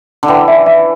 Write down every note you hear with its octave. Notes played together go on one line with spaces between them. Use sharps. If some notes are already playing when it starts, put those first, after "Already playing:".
D3
E3 G5
E5
E5